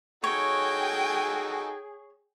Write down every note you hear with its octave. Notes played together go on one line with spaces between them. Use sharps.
D#4 F#4 G#4 A4 C#5 G5 G#5